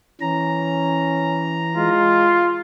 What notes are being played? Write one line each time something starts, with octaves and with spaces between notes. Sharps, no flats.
E3 C#4 A#5
G#3 F4